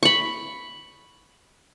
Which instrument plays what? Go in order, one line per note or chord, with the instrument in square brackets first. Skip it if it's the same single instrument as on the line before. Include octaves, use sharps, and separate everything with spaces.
[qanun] B5 C#6